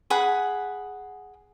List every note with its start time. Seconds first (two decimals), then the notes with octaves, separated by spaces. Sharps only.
0.10 G#4 F#5 B5